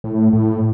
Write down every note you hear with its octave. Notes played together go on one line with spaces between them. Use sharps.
A2
A2